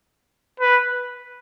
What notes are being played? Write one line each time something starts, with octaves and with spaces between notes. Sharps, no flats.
B4